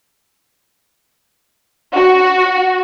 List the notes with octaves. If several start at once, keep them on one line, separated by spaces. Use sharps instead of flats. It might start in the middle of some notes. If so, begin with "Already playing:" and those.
F#4